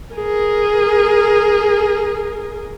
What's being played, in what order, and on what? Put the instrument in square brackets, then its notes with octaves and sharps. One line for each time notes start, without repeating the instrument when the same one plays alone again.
[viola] G#4 A#4